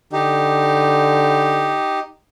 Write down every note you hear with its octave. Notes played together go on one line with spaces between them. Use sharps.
D3 D#4 G4